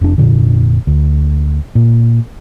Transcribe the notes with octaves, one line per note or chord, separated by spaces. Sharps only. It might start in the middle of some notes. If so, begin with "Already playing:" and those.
F1 D4
F1 A#1 A#2 D3
D2
A#2